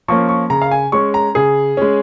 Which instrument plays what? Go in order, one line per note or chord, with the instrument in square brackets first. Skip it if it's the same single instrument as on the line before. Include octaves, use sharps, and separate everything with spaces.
[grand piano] F3 A#3 C#4 C#6
C#6
C#3 A#5
F5
G#5
G#3 C#4 C#6
A#5
C#3 G#4
G#3 C#4